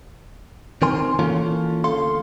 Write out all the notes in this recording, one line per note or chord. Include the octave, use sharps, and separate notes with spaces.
D#3 C4 A#4 G#5 C6
E3 A#3 C#4 F4 A4
D2 A4 F5 C6